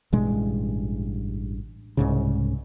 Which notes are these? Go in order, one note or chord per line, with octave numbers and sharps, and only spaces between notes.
A1 G2 B2 G#3
C2 G#2 C#3